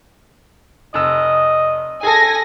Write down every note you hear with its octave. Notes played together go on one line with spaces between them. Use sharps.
F1 D#5 E6
G#4 A4 G#5 A#6